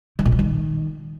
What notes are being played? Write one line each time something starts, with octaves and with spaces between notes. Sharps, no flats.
D#3
A#2
F#3
D#3